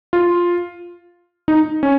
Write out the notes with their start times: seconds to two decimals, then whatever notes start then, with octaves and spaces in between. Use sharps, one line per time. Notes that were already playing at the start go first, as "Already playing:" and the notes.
0.13 F4
1.48 D#4
1.83 C#4